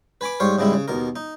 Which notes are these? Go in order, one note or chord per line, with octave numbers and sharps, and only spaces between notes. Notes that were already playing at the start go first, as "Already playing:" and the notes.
B4 G#5 B5 D6
G#2 G3 C5 C#5 F5
G#2 C#3 G3 G#3 E4
C#3
D#2 B2 A#4
D#4